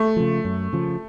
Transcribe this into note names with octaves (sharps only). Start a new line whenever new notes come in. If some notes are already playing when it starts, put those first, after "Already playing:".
Already playing: A3
C#3 F3
F#2
C#3 F3